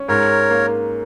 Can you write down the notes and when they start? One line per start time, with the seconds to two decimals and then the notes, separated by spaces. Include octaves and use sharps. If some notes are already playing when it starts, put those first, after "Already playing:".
Already playing: C#4
0.08 G#2 A#4 C#5
0.50 A#3